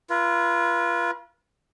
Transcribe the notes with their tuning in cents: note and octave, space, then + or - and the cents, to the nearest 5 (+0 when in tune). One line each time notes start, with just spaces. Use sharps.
F4 -25 B4 -40